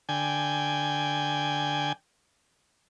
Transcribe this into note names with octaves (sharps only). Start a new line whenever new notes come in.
D3 G5 G#5